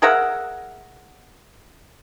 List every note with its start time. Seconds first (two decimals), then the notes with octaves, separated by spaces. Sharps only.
0.02 G#4 A#4 E5 F#5